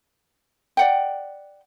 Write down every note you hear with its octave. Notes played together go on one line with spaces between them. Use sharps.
D5 F#5 G5